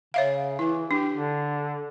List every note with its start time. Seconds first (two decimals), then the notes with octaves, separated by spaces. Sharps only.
0.14 C#3 C#5 E5 F5
0.59 E3 E4
0.91 D4 G4
1.14 D3